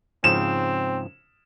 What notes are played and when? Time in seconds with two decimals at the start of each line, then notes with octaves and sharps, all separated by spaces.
0.24 G#2 C#3 F3 C4 E7